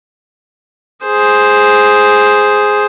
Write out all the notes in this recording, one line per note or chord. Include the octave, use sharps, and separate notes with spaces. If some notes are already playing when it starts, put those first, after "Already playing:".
G#4 C5